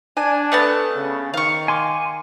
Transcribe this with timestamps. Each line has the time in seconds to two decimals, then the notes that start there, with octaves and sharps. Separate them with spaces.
0.17 D4 G#5
0.52 A3 B3 A5
0.96 C#3
1.34 D#3 F5 C#6
1.68 G#5 C6 D6